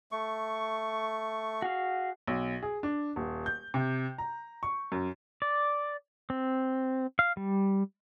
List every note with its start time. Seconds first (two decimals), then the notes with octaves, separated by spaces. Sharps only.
0.12 A3 C#6
1.62 F#4 G#4 F5
2.27 B1
2.63 G#4
2.83 D4
3.16 D#1
3.46 G6
3.74 C3
4.18 A#5
4.63 C#6
4.92 F#2
5.42 D5
6.30 C4
7.19 F5
7.37 G3